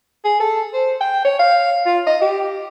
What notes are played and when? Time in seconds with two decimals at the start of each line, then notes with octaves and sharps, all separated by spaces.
0.24 G#4
0.40 A4
0.73 C5
1.01 G5
1.25 C#5
1.39 F5
1.86 F4
2.07 D#5
2.21 G4